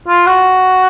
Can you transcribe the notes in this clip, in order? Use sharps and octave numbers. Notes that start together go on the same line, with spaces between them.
F4
F#4